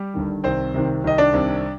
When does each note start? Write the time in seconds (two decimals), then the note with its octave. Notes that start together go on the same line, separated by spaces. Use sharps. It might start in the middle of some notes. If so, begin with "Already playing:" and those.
Already playing: G3 G4
0.14 G1 G2 D#3
0.44 C2 C3 D#3 C4 C5
0.74 C2 C3 D#3
1.04 C2 C3 D#3 D#5
1.18 D4 D5
1.33 C2 C3 D#3